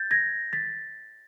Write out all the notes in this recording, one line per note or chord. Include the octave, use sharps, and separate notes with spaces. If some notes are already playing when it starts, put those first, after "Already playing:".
Already playing: G6 A6
G#6 A#6
A6 B6